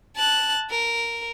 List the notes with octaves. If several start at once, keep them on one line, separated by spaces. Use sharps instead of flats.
A5 F#6
A#4